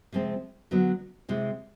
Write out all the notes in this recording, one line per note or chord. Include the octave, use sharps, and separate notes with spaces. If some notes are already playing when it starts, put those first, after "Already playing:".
C3 F3 G#3 C4
D3 F#3 B3
C3 E3 G#3